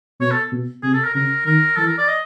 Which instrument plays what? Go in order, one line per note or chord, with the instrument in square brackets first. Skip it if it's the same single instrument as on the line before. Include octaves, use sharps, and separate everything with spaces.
[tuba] B2 [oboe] C#5
[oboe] A4
[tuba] B2
[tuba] C3 [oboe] G#4
[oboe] A4
A#4
[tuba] C#3 [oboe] A#4
[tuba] D#3 [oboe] A#4
[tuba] E3 [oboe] A4
[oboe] A#4
D5
D#5